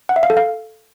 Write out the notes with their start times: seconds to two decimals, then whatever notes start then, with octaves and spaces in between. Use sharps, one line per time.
0.09 F#5
0.16 E5
0.23 F5
0.30 A4
0.37 F5